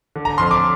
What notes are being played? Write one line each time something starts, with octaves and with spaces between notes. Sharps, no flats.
D3
A#5
F2 C6
D6